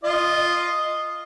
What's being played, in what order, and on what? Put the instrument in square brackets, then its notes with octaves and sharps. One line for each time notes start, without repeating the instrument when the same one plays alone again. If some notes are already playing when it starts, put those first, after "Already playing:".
[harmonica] F4 D#5